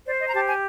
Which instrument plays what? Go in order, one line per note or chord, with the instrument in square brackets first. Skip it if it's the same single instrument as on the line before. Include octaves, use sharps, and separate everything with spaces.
[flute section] C5 D5
D#5
A#5
G4 A5
G#5